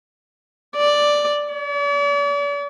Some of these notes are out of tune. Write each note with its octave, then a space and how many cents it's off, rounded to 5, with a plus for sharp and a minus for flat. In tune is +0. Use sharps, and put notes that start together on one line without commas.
D5 +0
D5 -45